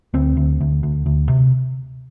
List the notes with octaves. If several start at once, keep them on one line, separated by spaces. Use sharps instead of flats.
D2 C4
D2
D2
D2
D2
C3